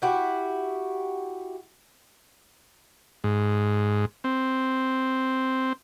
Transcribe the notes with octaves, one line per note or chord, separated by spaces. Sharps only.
E4 F#4 G4
G#2
C4